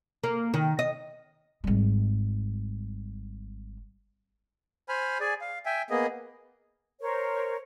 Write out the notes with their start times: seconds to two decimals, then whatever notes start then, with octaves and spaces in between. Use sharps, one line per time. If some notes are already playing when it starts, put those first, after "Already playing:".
0.24 A#3
0.54 D#3
0.79 D#5
1.64 G#1 G3
4.89 C5 G#5 B5 F6
5.20 G#4 D5 G#5
5.41 F5
5.66 E5 G5 G#5
5.90 A#3 B3 G#4 D#5
7.01 A#4 C5 C#5